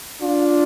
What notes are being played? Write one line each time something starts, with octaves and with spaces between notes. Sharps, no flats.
D4 F4